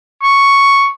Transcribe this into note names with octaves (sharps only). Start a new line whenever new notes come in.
C#6